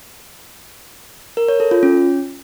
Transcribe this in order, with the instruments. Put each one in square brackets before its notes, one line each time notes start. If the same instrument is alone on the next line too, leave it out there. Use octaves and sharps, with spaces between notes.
[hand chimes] A#4
C#5
A4
F4
C#4